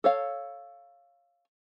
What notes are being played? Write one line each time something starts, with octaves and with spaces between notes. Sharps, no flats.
A4 C#5 F5